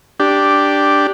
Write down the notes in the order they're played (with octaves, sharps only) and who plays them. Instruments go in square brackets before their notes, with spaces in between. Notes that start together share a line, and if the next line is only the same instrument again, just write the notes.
[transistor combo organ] D4 G4